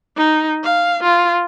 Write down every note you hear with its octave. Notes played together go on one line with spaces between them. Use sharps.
D#4
F5
F4